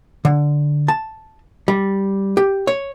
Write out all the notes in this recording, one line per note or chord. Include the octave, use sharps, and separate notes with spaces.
D3
A5
G3
G4
C#5